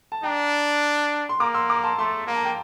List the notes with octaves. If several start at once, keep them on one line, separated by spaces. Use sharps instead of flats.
A5
D4 G5 A#5
C6
A#3 A#5 D6
C6 E6
A#5 D6
A5 C6
A3 A5 C6
A#3 A#5
A5
G5